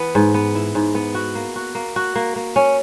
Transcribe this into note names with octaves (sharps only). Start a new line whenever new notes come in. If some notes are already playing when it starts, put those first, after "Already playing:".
Already playing: E3 B3
G#2
B3
E4
G#2
B3
F#4
A#3
F#4
A#3
F#4
A#3
A#3
C#4